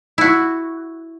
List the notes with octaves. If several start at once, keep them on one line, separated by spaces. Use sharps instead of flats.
E4 F#4